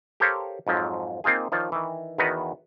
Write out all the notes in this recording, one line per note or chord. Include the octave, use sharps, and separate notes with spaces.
G4 A4 A#4 C5 C#5 F5
F2 G#2 F3 F#3
A#3 C4 D#4 F4 G#4
D#3 F3 F4 C#5 D5
D#3 E3
E2 D#3 B3 F#4 B4 A#5